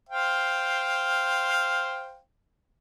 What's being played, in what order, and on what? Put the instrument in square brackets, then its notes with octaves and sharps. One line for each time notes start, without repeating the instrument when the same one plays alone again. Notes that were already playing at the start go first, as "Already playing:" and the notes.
[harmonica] C5 F5 G5